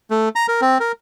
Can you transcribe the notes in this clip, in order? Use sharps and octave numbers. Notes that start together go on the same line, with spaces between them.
A3
A#5
A#4
C4
A#4